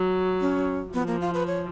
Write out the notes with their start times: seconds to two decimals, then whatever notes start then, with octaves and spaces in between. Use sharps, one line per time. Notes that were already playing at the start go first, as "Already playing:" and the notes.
Already playing: F#3
0.41 C#4
0.94 F3 B3
1.07 A#3
1.21 F4
1.34 B4
1.47 C#5